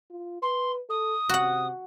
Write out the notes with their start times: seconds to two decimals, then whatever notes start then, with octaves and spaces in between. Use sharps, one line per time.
0.10 F4
0.42 B4 C6
0.89 A4 D#6
1.29 C3 F#4 F#5